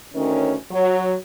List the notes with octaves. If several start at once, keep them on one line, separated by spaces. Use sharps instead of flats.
D2 D#3 C#4
F#3